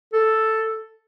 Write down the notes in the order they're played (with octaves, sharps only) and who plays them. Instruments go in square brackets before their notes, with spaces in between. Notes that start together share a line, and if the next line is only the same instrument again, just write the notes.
[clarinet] A4